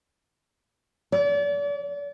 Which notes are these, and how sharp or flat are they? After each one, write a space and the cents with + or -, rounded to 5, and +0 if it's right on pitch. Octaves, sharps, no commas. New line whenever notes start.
D5 -40